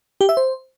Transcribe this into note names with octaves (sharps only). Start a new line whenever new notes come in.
G4
E5
C5